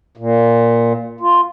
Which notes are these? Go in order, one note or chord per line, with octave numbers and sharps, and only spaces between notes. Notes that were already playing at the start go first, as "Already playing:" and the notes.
A#2
F4